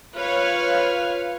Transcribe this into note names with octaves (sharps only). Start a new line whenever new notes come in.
F4 B4 C#5 F5